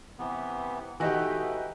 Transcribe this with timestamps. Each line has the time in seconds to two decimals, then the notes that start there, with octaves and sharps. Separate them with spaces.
0.19 C3 E3 B3
1.00 B2 E3 A3 D#4 F#4 G4